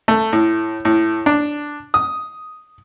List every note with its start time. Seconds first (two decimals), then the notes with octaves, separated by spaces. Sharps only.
0.08 A3
0.33 A2
0.85 A2
1.26 D4
1.94 D#6